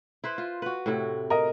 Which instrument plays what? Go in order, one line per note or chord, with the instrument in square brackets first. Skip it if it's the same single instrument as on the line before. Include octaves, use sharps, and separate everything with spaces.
[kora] E4 B4 C5
F4
F#4 B4
A2 C3 E4
[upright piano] A#4 D#5